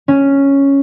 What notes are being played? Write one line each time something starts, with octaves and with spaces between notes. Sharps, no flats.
C#4